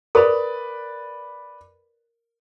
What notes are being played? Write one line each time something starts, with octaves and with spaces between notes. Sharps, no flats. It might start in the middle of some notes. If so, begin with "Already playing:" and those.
A#4 B4 D5 B5